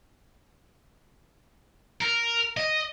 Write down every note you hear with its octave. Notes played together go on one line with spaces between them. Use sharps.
A#4
D#5